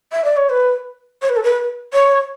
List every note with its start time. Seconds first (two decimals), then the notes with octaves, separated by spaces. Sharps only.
0.12 E5
0.24 D5
0.36 C#5
0.49 B4
1.22 C#5
1.29 B4
1.36 A4
1.43 B4
1.93 C#5